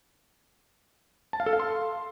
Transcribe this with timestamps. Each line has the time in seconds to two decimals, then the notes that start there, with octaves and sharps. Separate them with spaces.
1.33 A5
1.40 F5
1.46 A4
1.53 F5
1.60 C6